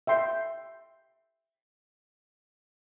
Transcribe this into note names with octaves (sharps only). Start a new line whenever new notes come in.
E5 G5 C6